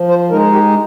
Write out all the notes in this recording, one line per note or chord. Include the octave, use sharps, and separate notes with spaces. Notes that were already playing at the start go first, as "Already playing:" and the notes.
Already playing: F3
C5
G#3 D#4 A#4
G4